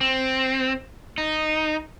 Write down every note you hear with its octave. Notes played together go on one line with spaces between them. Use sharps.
C4
D#4